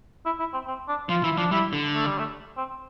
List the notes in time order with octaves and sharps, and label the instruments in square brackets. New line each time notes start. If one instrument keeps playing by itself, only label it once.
[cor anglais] E4
E4
C4
C4
D4
[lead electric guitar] F3 [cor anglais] F4
[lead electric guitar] E3 [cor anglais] E4
[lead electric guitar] F3 [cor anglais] D4
[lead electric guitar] G3 [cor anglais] E4
[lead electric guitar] D3
[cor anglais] A3
G3
A3
C4